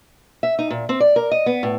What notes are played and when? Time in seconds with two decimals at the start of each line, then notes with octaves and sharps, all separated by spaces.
0.43 E5
0.59 D#4
0.70 A#2
0.89 C4
1.00 D5
1.16 A#4
1.31 D#5
1.46 B3
1.63 A2